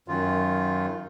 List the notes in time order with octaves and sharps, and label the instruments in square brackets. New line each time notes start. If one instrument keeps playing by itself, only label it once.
[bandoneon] F#2 D#3 F4